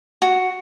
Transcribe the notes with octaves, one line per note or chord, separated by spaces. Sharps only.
F#4